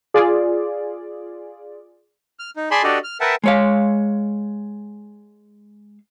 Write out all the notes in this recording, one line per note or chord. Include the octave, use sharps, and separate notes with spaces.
F4 G#4 D5
F6
D#4
G#4 D5 G#5 A5 B5 C6
D4 F#4 G4 A4 D5 D#5
F6
A#4 B4 E5 F#5 G5 A5
G#3 C#5 F5